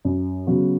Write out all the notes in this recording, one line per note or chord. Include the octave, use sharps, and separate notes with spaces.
F#2
C#3 F#3 B3 F#4